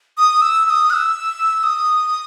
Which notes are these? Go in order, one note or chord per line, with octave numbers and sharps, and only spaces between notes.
D#6
E6
E6
D#6
F#6
E6
D#6